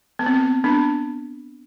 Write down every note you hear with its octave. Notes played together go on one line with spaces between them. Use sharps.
B3
C4
B3
B3 D4